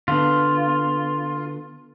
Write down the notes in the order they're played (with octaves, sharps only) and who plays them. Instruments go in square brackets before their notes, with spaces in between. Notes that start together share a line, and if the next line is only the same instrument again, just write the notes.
[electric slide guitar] D3 B3 [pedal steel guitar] F4